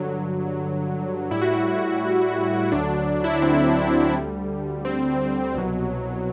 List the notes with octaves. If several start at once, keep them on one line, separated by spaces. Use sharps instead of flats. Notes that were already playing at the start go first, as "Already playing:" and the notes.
Already playing: G2 D3 F#3
A2 G3 E4
F#4
E4
D2 D3 F#3 D4
E4
D4
C4
D2 D3 G3
C4
C2 B2 F#3